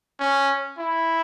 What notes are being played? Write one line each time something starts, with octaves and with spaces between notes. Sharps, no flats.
C#4
E4